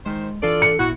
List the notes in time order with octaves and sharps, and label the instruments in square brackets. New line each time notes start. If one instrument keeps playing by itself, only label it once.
[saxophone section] D#3 C5 [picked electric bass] G#3
[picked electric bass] E3 D4 [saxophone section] F4 D5 [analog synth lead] A4
[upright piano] C#7
[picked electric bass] G#1 A#2 B3 [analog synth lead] E4 [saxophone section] F#4